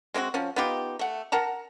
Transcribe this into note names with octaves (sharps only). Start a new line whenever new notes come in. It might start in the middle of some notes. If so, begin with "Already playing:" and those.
G#3 C4 F4 F#4
F3 F#3 C#4
B3 D#4 F4 G4
A3 F#5
A#4 F#5 A5 A#5